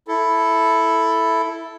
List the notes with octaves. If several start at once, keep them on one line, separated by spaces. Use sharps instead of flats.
E4 A4